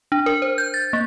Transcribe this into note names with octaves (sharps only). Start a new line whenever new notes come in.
D4
A#4
C5
G6
A6
A#3